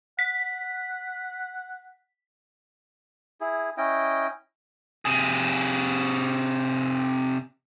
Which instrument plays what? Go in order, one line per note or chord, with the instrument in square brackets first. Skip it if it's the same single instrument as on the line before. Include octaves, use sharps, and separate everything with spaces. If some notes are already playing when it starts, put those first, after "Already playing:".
[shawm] F#5 [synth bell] B6
[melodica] E4 G#4
C#4 E4 D#5 G5
[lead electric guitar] C3 G#4